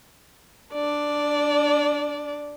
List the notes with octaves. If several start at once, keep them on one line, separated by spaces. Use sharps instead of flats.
D4 D5